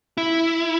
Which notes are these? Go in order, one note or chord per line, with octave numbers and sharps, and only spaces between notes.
E4